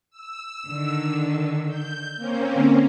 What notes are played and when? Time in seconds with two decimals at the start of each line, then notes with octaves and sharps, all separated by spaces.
0.10 E6
0.67 D3 D#3
1.68 G6
2.17 A#3 C4 C#4
2.55 D3